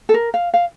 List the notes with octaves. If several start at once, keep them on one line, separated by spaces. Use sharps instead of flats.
A4
A#4
F5
F5